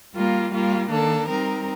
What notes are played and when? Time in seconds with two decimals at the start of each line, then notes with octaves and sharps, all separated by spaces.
0.12 G3 A#3 F4
0.51 G3 A#3 F4
0.89 D#3 A#3 D4 A4
1.28 G3 C4 D#4 A#4